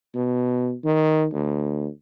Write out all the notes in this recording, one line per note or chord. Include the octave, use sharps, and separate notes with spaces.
B2
D#3
D2